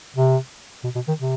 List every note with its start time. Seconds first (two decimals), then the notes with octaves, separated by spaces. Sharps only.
0.16 C3
0.84 B2
0.95 B2
1.08 D#3
1.19 C3